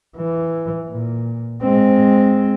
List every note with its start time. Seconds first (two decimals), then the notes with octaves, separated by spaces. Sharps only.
0.16 E3
0.90 A#2
1.62 G#3 C4